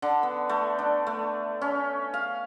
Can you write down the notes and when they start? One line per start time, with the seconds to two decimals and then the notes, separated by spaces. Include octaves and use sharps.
0.02 D3
0.23 B3
0.49 A3
0.79 D4
1.07 A3
1.62 C#4
2.14 F5